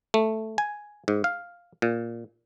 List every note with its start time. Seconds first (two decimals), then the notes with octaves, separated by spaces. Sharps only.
0.14 A3
0.58 G#5
1.08 G#2
1.24 F5
1.82 A#2